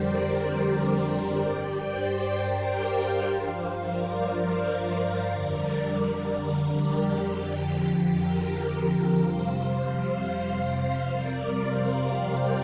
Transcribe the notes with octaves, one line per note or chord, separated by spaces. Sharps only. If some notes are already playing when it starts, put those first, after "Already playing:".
Already playing: F2 D3 G3 G4 A#4 C5 D5
G2 G3 D5 G5
G4 C5
A#4 D5
C5 F5
G2 F3 C5 F5
A#4 D5
A#4 D5
F2 D3 G3
A#4
G4
F2 D3 F3
A#4
F2 C3 G3 C5 F5
C5 F5
F2 C3 G3 A#4 D5
C5 F5
D5 G5